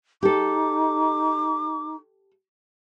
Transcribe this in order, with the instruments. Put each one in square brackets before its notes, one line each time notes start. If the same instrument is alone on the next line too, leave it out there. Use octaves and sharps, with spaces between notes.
[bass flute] D#4 [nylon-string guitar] G4 A4 [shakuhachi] D6